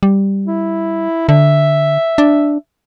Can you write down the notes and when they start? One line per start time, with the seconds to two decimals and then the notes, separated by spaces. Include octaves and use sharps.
0.03 G3
0.46 E4
1.29 D3 E5
2.18 D4